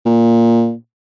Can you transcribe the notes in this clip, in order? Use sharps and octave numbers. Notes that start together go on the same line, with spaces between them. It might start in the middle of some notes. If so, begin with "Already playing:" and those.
A#2